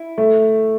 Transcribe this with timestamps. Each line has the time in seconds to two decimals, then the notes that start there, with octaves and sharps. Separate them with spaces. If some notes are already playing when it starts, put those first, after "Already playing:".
Already playing: E4
0.18 A3